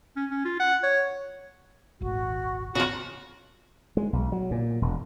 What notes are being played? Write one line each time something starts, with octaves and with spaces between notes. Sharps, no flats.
C#4
C#4
F4
F#5
C#5
D#1 G#1 F#4
F2 C#3 F4 F#4
G#3
B1
F#3
A#2
E1